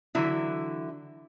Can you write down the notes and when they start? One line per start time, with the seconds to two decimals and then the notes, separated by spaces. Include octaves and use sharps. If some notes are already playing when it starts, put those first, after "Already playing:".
0.15 D3 E3 F#3 E4